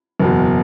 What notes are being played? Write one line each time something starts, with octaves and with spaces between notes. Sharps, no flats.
F#1 E2 B2